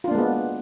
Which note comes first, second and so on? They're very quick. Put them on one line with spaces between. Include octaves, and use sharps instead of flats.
F4 D4 A#3 G#3 B3